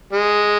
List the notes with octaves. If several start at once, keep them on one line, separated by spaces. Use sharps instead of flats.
G#3